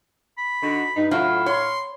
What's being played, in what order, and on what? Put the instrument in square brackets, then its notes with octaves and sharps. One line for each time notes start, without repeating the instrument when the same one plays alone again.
[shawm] B5
[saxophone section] D3 D#4 F#4
G2 D#4
[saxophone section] A2 A4 F5 [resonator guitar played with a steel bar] F#3 E4 F4
[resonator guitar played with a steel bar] C#5 [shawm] C6